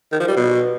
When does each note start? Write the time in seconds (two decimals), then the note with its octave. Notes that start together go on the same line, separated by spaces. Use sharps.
0.12 D#3
0.20 F3
0.28 G3
0.36 B2